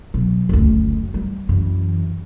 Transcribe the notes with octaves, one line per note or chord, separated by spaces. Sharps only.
B2 F#3
F#1 D2
G3
F#2 E3